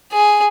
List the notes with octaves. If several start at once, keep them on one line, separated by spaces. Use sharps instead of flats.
G#4